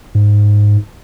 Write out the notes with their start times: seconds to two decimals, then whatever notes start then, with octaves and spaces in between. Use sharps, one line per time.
0.15 G#2